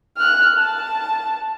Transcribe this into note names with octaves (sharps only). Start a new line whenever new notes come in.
F6 F#6
A5